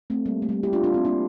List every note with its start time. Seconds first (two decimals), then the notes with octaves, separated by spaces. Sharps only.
0.10 A3 C4
0.26 G3 A#3
0.42 A3
0.49 G3
0.52 A3
0.63 E4 G4
0.73 D4 F4
0.84 D4 F4
0.94 C4 E4
1.05 A#3 D4